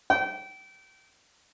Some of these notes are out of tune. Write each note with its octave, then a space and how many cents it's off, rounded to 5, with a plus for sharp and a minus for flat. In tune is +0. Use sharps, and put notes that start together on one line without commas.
G5 -30